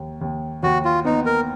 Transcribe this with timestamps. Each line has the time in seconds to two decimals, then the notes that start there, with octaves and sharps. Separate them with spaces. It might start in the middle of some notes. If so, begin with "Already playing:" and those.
Already playing: D#2
0.21 D#2
0.63 D#2 F#4
0.85 F4
1.05 B3 D#4
1.26 A#4